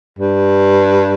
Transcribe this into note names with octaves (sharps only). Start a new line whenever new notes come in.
G2